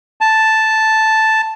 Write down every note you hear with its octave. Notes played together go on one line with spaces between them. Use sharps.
A5